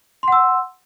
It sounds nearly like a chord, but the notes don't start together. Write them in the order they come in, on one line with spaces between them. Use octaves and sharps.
C6 F#5 E6